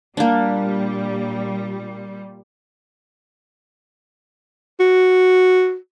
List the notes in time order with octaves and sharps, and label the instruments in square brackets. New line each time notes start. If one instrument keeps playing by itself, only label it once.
[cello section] A#2 G3 [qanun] A#3 D4
[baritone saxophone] F#4